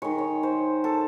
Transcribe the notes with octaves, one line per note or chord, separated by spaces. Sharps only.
D#3 G#3 C#5
C#5
C5
A4